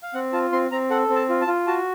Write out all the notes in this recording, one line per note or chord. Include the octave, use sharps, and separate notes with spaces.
F5
C4 F#5
F4 A5
C4 C6
C4 A#5
A4 F#5
C4
A5
F4
A5
F4
F#4 A5